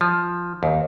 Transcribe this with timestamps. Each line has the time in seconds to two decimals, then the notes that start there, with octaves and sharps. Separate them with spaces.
0.01 F3
0.63 D#2